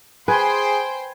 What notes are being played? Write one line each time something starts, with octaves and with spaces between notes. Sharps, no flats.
G#4 B4 C5 G5 G#5 C6